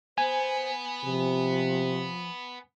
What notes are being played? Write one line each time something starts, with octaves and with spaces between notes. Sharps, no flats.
B3 C5 G#5
C3 F3